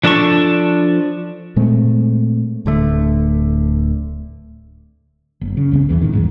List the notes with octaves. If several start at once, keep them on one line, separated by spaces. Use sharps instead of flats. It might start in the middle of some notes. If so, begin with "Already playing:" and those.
F3 D4 A4 A5 C#6
A#2 G#3 A3 C4
D1 D3 A3
F#1
C#3
C2 C#3 C4
E1 A#1 E2 E3
D#1 C#2 A2 D#3
B1 E2 G#2